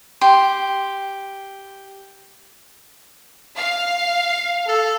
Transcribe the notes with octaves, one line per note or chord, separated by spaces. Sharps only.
G4 C6
F5
A4